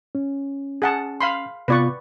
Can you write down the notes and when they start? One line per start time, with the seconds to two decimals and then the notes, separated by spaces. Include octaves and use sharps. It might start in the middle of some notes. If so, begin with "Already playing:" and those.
0.15 C#4
0.82 G#4 F#5 A5
1.21 F5 B5 C6
1.68 C3 B3 F4 B4 D5 C#6